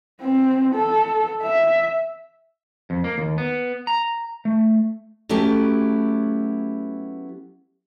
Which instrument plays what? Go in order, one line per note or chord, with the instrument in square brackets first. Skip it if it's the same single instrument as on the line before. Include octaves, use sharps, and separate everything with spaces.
[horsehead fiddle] C4
A4
E5
[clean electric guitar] F2
A#3
D#2
B3
A#5
A3
[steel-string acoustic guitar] F#3 A3 B3 C#4 E4 G4